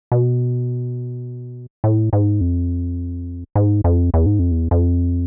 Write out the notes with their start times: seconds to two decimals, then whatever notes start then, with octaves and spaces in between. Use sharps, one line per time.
0.12 B2
1.84 A2
2.13 G#2
2.41 F2
3.56 G#2
3.84 F2
4.14 E2
4.26 G#2
4.39 F2
4.51 E2
4.71 F2